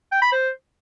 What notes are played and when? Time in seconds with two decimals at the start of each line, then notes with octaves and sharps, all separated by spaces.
0.12 G5
0.22 B5
0.32 C5